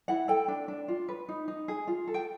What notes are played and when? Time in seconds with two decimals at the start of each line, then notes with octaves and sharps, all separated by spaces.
0.08 E4 F#5
0.28 A4 G5
0.48 D4
0.68 D4
0.88 F4
1.08 B4
1.29 D#4
1.48 D#4
1.68 G#4
1.87 F4
2.08 A4
2.14 G5